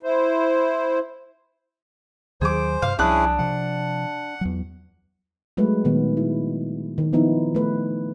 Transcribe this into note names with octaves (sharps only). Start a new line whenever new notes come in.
E4 C5
D#2 D#3 F#3 G#4 C5 D6
G2 C3 F5
C2 F3 C#4 D4 E4 G#4 F#6
C3 F3 F#5
E2 F#3
F#3 G#3 A3 F#4 B4
A#2 D#3 B3
E4
D#3
F3 B3 D#4 E4
A3 B4